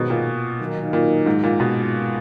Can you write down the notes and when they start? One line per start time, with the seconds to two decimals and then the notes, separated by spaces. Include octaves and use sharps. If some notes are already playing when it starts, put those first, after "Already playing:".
Already playing: G#2 B2 D#3 F#3 B3 D#4
0.10 A#2
0.60 D#3 F#3 A#3 D#4
0.93 A#2
1.26 G#2
1.43 A#2
1.60 B2